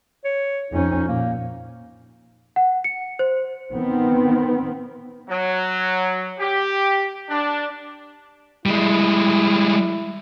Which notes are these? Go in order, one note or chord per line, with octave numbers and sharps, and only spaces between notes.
C#5
F2 C#4 D#4
A#2 A#3
F#5
C#7
C5
D#3 B3 C4
F#3
G4
D4
G3 G#3 E4